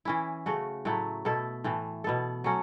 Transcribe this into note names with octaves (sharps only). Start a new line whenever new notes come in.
E3 C#4 E4
C#3 A3 F#4
A2 F#3 A3 E4
B2 A3 E4 A4
A2 E3 A3
B2 B3 A4
F#3 A3 C#4 F#4